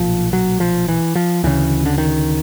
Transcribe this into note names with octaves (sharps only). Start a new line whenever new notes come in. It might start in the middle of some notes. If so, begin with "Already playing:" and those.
Already playing: B1 A#2 F3
F#3
F3
E3
F3
D2 C#3 E3
D3
D#3